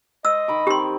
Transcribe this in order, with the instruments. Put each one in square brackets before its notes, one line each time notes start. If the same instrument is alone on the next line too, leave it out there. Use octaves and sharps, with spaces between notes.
[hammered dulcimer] C5 [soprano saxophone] D#5 [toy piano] E6
[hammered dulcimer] D#3 B5 D6
[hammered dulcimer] D#3 C4 [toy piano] G4 C6